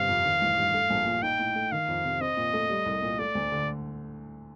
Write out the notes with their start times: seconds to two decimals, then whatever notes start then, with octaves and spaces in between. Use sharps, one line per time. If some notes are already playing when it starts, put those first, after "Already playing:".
Already playing: G1 G2 C3 F5
0.09 F2
0.25 D#3
0.41 A1
0.58 G2
0.74 A3
0.90 A#1
1.06 A#2
1.23 D#4 G5
1.40 A2
1.56 A3
1.72 D#3 F5
1.88 F2
2.04 C3
2.21 C4 D#5
2.37 A#2
2.54 A3
2.70 G3
2.86 C2
3.02 A#2
3.19 A3 D5
3.35 D2
3.52 D3